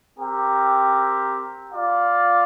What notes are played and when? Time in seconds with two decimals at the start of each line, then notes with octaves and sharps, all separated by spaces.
0.19 C4 G4 A#4
1.73 F4 D5 F5